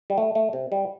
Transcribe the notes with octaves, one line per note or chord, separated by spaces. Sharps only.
G3
A3
A3
C3
G3